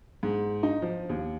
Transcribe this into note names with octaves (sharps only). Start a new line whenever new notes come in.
G#2
D#4
F3
D#2